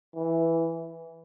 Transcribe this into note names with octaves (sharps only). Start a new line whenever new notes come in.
E3